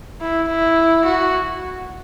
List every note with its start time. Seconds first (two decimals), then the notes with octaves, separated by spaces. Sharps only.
0.21 E4
0.49 E4
1.05 F#4